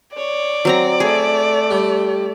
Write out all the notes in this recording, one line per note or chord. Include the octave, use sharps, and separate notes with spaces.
C#5 D5
F#3 C4 A#5
A3 G#4
G3